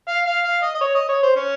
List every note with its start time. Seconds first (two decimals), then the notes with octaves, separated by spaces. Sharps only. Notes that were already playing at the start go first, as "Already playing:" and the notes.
0.08 F5
0.26 F5
0.45 F5
0.63 D#5
0.74 D#5
0.81 C#5
0.95 D#5
1.09 C#5
1.23 C5
1.36 C#4